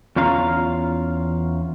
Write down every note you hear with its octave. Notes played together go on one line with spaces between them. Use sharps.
E2 C#4 F4 F5 A#5